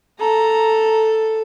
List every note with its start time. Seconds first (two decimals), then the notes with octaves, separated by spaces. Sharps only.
0.20 A4 A#5